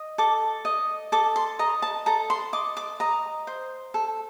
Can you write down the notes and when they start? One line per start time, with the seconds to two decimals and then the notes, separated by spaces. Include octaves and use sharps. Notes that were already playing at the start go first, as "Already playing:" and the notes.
Already playing: D#5
0.18 A4 D6
0.65 D#5
1.12 A4 D6
1.36 C6
1.59 D#5 A#5
1.82 A5
2.06 A4 A#5
2.30 C6
2.53 D#5 D6
2.77 D6
3.00 D#5 A#5
3.47 C5
3.94 A4